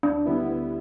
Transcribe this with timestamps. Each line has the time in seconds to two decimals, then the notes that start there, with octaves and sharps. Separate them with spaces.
0.03 D2 D4
0.25 D3 G3 B3 E4
0.47 D2